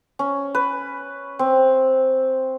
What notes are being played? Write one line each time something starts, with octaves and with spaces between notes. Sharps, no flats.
C#4
B4
C4